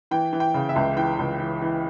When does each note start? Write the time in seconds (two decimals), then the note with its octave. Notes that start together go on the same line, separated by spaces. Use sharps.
0.11 E3 G5
0.33 E3
0.40 G5
0.54 C#3
0.69 E5
0.76 C#2
0.96 E3 G5
1.19 C#2
1.40 E3
1.62 E3